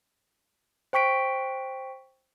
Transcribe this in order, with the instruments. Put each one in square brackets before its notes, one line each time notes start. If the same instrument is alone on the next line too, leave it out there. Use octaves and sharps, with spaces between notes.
[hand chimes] C5 G5 C#6 B6 D7